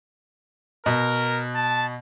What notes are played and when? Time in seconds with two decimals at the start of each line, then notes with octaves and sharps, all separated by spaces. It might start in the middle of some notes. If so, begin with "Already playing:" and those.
0.86 B2 A#4
1.55 A5